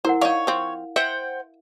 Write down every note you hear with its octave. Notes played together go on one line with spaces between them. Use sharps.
E4 A#4 C5 F#5
D#4 C#5 D5 F5
F3 C4
C5 E5 F#5 G5